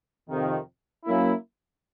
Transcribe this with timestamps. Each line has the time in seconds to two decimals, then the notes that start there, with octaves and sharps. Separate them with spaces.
0.29 F2 C3 D#3
1.05 F#3 A#3 C#4 E4